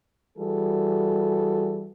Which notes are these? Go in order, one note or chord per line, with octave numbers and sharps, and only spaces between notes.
E3 G3 F#4 G#4 A4